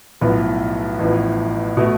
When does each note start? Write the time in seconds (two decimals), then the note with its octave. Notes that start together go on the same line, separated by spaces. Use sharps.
0.21 B1 A2 F3 B3
0.99 A1 A2 F3 B3
1.77 B2 A3